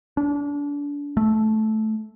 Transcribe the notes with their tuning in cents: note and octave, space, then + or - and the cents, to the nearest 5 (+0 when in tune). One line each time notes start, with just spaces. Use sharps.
D4 -30
A3 -15